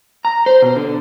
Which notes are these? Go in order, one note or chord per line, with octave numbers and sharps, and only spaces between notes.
A#5
C5
B2
D3